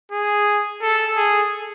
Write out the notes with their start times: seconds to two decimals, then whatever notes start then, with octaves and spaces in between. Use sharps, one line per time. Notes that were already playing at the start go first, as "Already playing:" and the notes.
0.12 G#4
0.82 A4
1.17 G#4